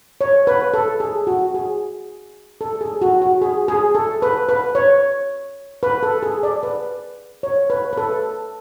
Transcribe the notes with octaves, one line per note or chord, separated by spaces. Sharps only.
C#5
B4
A4
G#4
F#4
G#4
A4
G#4
F#4
F#4
G#4
G#4
A4
B4
B4
C#5
B4
A4
G#4
D5
B4
C#5
B4
B4
A4